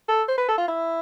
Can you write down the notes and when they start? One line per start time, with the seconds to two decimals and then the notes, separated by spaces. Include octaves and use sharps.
0.08 A4
0.28 C5
0.38 B4
0.48 A4
0.58 F4
0.68 E4